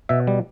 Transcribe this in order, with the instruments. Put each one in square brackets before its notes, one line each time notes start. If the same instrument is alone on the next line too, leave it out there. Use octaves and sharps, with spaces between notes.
[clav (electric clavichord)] B2 E5
G3